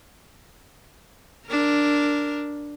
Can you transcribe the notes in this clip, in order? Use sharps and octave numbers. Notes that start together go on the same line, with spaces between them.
D4 A#4